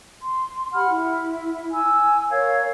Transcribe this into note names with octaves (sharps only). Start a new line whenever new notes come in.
C6
G4 F#5 B5 F6
E4
G#5 E6
A#4 C#5 F5 G#6